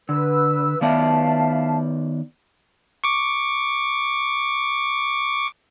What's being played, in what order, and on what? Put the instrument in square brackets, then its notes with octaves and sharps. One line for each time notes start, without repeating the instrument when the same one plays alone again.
[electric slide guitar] D3 [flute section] B4 E6
[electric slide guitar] D#3 B3 D5 [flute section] E5 F5 A5
[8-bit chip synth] C#6 D6